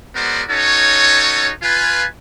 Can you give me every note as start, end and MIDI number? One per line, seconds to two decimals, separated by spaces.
0.15 0.42 56
0.15 0.42 59
0.15 0.42 66
0.15 0.42 70
0.15 0.42 72
0.15 0.42 74
0.49 1.51 61
0.49 1.51 63
0.49 1.51 66
0.49 1.51 69
0.49 1.51 73
1.62 2.04 65
1.62 2.04 71
1.62 2.04 80